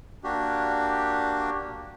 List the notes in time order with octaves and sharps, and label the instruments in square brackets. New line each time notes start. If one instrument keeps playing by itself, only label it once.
[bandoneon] A#3 D4 F#4 G4